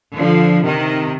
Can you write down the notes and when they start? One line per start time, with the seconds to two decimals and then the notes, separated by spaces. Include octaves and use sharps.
0.16 D3 F3
0.63 C3 D#3